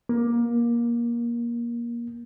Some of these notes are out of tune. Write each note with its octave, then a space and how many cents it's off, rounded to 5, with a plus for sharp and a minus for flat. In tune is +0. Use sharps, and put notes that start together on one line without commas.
A#3 +20